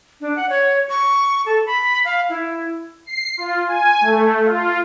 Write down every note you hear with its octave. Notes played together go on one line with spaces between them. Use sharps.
D4
F#5
C#5
C#6
A4
B5
F5
E4
C7
F4
G#5
A3
F4